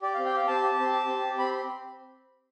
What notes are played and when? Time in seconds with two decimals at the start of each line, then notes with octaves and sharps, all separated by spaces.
0.02 G4 D5
0.14 C4 F5
0.26 G5
0.33 G4 F5
0.47 C4 A5
0.62 G4
0.79 C4
0.93 G4
1.08 C4
1.23 G4
1.38 C4 B5